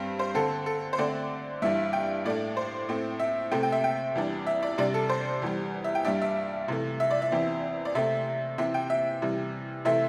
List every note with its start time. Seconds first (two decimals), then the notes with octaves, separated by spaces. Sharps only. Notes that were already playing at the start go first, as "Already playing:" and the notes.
Already playing: G2 G3 C4
0.19 C5
0.35 D3 C4 A4
0.66 A4
0.93 C5
0.98 D3 A3 C4 D5
1.62 G2 E3 G3 D4 E5
1.93 G5
2.25 A2 A3 D4 D5
2.57 C5
2.89 A2 A3 C4
3.20 E5
3.51 C3 A3 C4 G5
3.63 G5
3.72 E5
3.84 G5
4.15 E2 E3 G3 D4
4.47 E5
4.63 D5
4.78 C3 G3 D4 D5
4.94 A4
5.09 C5
5.42 E2 E3 G3
5.84 E5
5.95 G5
6.05 G2 G3 D4 E5
6.22 E5
6.68 C3 E3 A3
7.00 E5
7.11 D5
7.22 E5
7.32 E2 E3 C4
7.85 D5
7.95 C3 A3 C4 E5
8.58 C3 E3 C4 E5
8.74 G5
8.90 E5
9.22 C3 E3 G3
9.85 C3 E3 A3 C4 E5